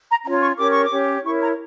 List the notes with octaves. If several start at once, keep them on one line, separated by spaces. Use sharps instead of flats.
A#5
C#4 F4 C#5 A#5
C#6
C#4 G4 A#4 C#5 D6
C#6
D6
C#4 G4 C#5
E4 A#4 C#5 C#6
A#5